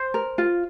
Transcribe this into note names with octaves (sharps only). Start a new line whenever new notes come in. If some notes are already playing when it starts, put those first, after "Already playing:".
Already playing: C5
A#4
F4